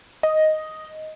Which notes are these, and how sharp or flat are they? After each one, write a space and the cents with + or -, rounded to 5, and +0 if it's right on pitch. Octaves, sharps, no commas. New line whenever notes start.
D#5 +5